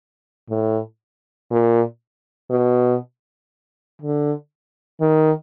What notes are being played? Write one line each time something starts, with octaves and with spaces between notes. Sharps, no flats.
A2
A#2
B2
D3
D#3